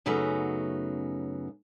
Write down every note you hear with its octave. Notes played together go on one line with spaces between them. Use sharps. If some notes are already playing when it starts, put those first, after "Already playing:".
F#2 C#3 F#3 A3 B3 D#4